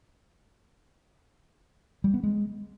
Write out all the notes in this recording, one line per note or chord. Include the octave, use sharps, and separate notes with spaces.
G3
B3
G#3